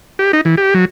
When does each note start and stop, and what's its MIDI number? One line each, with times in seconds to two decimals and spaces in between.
0.19 0.32 67
0.33 0.41 63
0.45 0.55 52
0.58 0.74 67
0.74 0.85 54